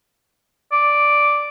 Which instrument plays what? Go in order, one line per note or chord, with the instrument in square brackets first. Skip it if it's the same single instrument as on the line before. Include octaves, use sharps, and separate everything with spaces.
[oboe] D5